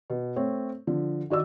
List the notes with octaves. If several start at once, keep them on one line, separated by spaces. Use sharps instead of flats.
B2
A3 C4 C#5
D3 F3
D#3 F#4 D5 E6